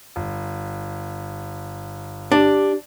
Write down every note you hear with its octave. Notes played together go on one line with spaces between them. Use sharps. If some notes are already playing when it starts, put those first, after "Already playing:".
G1
D4 G4